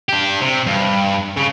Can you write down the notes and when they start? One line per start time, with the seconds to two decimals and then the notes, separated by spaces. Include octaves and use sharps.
0.09 D4 G4
0.42 C3
0.68 G2
1.37 C#3